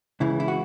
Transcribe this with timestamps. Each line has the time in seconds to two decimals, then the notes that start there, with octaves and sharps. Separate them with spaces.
0.20 C#2 C#3 E3 E4
0.40 E4
0.48 F#4